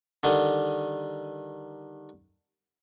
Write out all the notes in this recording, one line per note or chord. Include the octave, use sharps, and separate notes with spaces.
D3 D#3 G3